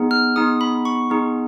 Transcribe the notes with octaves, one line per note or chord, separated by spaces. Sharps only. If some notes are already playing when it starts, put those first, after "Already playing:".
Already playing: B3 D#4 G#4
F6
B3 D#4 G#4 D#6
B5
C#6
B3 D#4 G#4